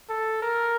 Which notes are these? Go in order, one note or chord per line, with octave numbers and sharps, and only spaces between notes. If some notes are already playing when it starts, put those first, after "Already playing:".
A4
A#4